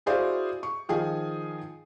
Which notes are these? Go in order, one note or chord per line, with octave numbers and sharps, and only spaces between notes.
E4 F#4 G#4 C5 D5 F5
C#6
D#3 F3 G#4 D#5 F5 G#5